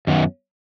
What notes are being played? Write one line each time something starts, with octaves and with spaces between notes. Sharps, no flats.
F#2 D#3 B3